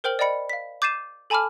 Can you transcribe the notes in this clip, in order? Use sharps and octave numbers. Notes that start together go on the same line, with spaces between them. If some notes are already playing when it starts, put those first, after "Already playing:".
A#4 C5 G5 F6 F#7
D5 D#5 G5 B5 C#7
F5 B6
D6 G6 A6 C7 D#7 E7
A4 G#5 A5 B5 D6 F6